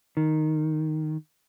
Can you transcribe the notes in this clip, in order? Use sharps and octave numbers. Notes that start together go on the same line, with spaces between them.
D#3